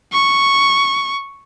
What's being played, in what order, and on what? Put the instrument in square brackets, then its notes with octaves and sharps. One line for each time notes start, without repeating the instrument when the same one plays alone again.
[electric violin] C#6